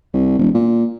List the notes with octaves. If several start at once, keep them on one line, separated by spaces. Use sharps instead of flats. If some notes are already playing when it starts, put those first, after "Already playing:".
C2
E1
A#2